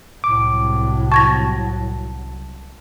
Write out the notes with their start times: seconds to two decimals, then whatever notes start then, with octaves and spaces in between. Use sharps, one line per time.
0.24 C2 A2 F#3 D6
1.12 A5 C#6 G#6 A#6